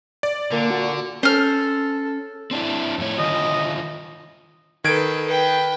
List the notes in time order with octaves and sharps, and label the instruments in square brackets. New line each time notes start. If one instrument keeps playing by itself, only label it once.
[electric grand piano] D5
[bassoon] A#2 [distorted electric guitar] D3 [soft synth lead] A#3
[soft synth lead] F#4
[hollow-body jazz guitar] C#4 [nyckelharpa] A4 [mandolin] C5 F6
[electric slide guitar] C4 D4 E4
F2 A2 C#5
[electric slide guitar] D3 D#3 F4 [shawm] D#5
[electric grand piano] D#3 G#6 D7 [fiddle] A4 B4
[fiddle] B4 G5